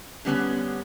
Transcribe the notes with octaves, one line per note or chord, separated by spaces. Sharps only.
D3 G3 B3 C#4